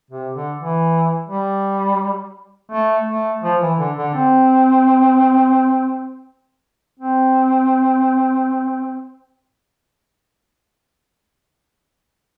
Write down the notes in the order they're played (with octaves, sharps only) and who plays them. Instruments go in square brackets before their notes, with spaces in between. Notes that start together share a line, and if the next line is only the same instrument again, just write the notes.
[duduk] C3
D3
E3
G3
A3
A3
F3
E3
D3
D3
C4
C4